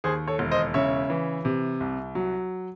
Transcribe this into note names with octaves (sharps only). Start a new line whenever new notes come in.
D#2 G#4 C5
A4 C#5
E1
C5 D#5
C#3 C#5 E5
E3
C3
C2
F#3